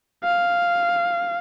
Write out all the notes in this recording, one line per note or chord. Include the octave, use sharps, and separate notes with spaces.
F5